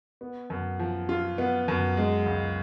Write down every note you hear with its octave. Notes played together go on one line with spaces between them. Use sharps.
B3
F#2
F3
F4
B3
F#2
G#3
C#2